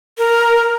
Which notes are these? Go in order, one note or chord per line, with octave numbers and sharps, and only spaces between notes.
A#4